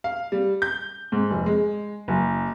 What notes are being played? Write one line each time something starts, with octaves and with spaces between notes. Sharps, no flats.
F5
G3
G6
G#2
F1
G#3
F#1